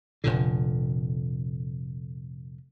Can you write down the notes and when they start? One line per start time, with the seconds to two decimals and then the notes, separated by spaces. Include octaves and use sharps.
0.24 F1 A#2 D3